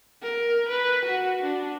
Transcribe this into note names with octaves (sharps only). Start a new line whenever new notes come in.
A#4
B4
F#4
D4